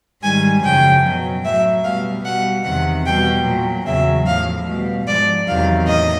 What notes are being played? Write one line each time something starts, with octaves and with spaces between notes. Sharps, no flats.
G#2 D#3 G3 G#5
F#2 C#3 F3 G5
B2 F#3
A2 F#3 E5
B2 G3 F5
B2 G3 F#5
E2 C3 D#3 F#5
B2 G3 G5
A#2 F#3
E2 C#3 F#3 E5
A2 F3 F5
B2 G3
G#2 F3 D5
E2 C3 D#3 F#3 F5
A2 D#5